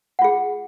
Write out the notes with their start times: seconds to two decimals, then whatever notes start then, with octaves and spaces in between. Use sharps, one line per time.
0.19 F#5
0.22 F4
0.24 G#4